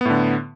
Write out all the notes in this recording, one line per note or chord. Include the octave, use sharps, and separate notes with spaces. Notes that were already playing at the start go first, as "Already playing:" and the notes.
A2 D3 B3